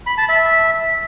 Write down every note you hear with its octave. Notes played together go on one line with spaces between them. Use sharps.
B5
A5
E5